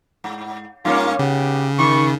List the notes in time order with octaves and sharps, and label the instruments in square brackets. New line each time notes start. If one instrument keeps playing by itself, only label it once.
[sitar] G#2
[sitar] G2 A#3 C#4 [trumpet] F4
[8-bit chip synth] C#3 [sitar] B3 [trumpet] G4
[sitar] D#3 [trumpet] C#6